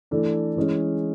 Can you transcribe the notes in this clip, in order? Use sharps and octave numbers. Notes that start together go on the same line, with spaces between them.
E3 A3 D4
E3 G#3 C#4